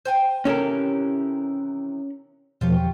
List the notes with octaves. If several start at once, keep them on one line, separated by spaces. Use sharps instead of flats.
C5 G5 G#5
C3 D#3 E3 C#4 A4 A#4
E2 B2 F3 F4 G4 C#5